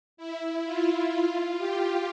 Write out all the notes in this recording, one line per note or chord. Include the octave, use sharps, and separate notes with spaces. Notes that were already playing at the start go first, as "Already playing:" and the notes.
E4
F4
F4
G4